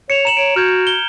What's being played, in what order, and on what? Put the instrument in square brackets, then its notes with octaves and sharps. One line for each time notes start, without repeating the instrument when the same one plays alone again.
[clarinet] C#5 [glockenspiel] C#7 E7 F7
[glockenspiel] A#5 E7 F#7
[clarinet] C#5 [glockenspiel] D7
[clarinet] F#4 [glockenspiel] F6 G6 G#6
[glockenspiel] G7